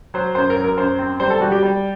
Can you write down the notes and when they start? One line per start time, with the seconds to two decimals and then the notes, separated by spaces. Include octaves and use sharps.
0.14 F#3 C5
0.35 F#2 C5
0.50 A#4
0.56 F#3
0.64 A#4
0.78 F#2 C5
0.99 C4
1.20 G3 C5
1.30 A4
1.41 G3 F#4
1.52 G4
1.63 G3